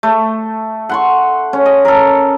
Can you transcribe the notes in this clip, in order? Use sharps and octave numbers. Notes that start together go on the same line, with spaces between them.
A3
F#5 C6 C#6
C#4
D#5
A4 A#4